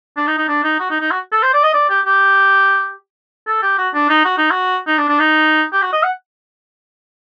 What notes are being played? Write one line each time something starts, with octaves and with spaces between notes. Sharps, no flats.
D4
D#4
D#4
D4
D#4
F#4
D#4
D#4
F#4
A4
C5
D5
D#5
D5
G4
G4
A4
G4
F#4
D4
D#4
F#4
D#4
F#4
D#4
D4
D4
D#4
G4
F#4
D#5
F#5